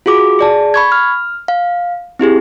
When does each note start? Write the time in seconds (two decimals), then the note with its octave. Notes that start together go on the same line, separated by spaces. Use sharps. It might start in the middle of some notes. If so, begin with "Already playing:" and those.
0.06 F4 F#4 G#4 D6
0.39 G#4 D5 A5
0.74 B5 C#6 G#6
0.92 F6
1.48 F5
2.19 C4 E4 G4 G#4